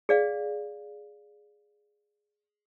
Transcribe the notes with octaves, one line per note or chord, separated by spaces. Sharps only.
G#4 D5 F5